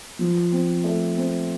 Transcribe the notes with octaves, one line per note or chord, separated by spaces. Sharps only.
F3
C4
A3
C4